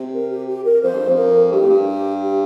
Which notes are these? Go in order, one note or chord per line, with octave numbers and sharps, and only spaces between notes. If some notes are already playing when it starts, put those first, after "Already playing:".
Already playing: C3
A#4
G4
G4
A#4
F2 C5
G2
F2
A#4
G2 G4
A2
G2
G4
G4